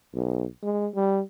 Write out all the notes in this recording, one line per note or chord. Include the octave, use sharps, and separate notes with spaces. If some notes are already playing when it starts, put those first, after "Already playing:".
B1
G#3
G3